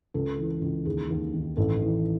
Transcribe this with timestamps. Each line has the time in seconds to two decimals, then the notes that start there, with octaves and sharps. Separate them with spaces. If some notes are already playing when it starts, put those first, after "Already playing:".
0.14 C#2 A4
0.37 E3
0.51 A4
0.61 C#2
0.85 D#2 G#4
1.10 D#2
1.34 D#3
1.57 A1 A4
1.82 E3